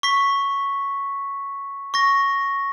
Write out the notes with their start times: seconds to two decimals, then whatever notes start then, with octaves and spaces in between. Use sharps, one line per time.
0.03 C#6 B6
1.94 C#6 A#6